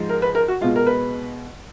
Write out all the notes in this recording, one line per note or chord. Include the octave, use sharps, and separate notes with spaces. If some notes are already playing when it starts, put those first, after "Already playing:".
Already playing: G#2 F3 G#3
A#4
B4
A#4
F#4
B2 G#3 F4
A#4
B4